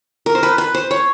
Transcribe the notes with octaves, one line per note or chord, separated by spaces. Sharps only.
A#4
C5
B4
B4
C5
C#5